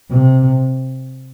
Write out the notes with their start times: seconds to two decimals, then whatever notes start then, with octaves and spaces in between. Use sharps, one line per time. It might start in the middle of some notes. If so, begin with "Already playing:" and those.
0.10 C3